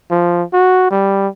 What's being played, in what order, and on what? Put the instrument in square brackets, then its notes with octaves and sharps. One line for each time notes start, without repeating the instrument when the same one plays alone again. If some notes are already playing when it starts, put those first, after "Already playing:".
[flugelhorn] F3
F#4
G3